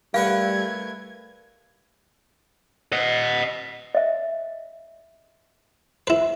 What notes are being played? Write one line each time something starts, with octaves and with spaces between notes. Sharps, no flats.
G3 A3 A#4 B4 F5 F#5 G#6
D#5 F#5
D#5 E5
E4 B4